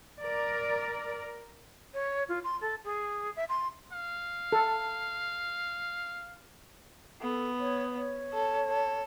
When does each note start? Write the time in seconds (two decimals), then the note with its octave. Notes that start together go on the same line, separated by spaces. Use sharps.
0.23 A#4 D5
1.94 C#5
2.29 F4
2.44 C6
2.61 A4
2.85 G#4
3.36 E5
3.49 C6
3.93 F5
4.52 A4
7.21 B3 A4
7.59 C#5
7.95 C#5
8.33 A4
8.69 A4